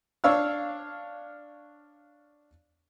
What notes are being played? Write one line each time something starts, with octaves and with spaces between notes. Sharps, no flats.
D4 C#5 F5 E6 F6